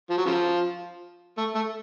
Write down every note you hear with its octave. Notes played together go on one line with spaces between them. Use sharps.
F3
F#3
C#3 F3
A3
A3